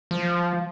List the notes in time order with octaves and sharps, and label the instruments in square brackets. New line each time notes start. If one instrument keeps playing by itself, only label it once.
[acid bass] F3